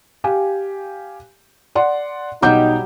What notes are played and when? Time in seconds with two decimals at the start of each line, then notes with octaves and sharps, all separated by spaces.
0.24 G4 F5 G#5
1.75 D5 F#5 C6
2.42 B1 F#3 G3 D#4 E5 D6 G6